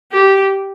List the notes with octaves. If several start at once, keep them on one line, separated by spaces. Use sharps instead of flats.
G4